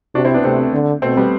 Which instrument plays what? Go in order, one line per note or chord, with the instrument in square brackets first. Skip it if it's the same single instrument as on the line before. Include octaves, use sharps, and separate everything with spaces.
[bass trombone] C3 [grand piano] D4 F#4
[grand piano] C4 E4
B3 D4
[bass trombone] C3 [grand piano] A3 C4
[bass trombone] D3
[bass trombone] B2 [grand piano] A3 C4
[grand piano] G3 B3